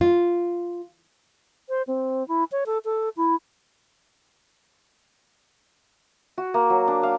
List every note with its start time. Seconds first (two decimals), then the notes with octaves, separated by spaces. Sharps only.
0.01 F4
1.69 C5
1.87 C4
2.28 E4
2.52 C#5
2.66 A4
2.85 A4
3.17 E4
6.38 F#4
6.54 A#3
6.70 F#3
6.88 D4
7.03 F5